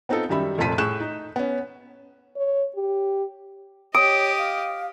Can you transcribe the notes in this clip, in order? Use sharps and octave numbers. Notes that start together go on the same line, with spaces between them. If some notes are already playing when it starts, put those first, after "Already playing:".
B3 C4 D#4 F4 A4
F#2 D#3 G3 E5 B5
F1 F2 A#2 A5 B6 D#7
A2 G#4 C#6 F#6 G6 E7
D#4
B3 C#4
C#5
G4
G4 C#5 D#5 D#6 D7
F5